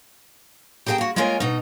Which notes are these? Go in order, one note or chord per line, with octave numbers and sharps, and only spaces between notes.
G4 G#4 A#4 B4 G5 A5
A#3 F#4
G#3 A#3 F4 A#4 C#5 G#5
B2 D#4